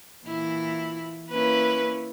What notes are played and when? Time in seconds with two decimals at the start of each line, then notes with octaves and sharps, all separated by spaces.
0.25 A#2 E3 E4
1.30 A#3 C#4 E4 B4